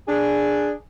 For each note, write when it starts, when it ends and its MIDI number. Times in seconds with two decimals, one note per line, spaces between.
0.08 0.72 62
0.08 0.72 68